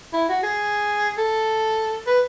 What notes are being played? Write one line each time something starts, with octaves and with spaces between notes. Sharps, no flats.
E4
F#4
G#4
A4
B4